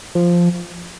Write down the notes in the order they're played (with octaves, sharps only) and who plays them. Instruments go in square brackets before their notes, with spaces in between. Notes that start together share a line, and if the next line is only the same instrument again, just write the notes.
[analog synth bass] F3